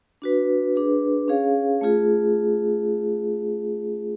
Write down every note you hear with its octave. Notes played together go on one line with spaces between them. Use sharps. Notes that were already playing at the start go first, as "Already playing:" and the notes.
D4 F#4 B4
D4 G#4 B4
C#4 G#4 C#5 F5
A3 F4 G#4